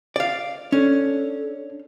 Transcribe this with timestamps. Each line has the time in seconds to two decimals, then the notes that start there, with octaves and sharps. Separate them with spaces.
0.16 D5 F5
0.72 C#4 D4 A4